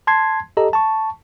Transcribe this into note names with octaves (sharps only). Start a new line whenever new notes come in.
A5 C6 G#6 C7
G4 A4 D#5 A#5
A5 C#6